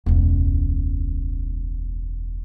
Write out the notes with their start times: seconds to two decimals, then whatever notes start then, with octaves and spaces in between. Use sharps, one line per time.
0.06 E1 C#2